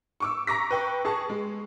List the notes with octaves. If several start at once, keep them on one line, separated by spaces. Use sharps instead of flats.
C#6 D6 E6
A#5 C#6 D6 A#6 B6
B4 G5 C#6
G#4 A5 C#6
G#3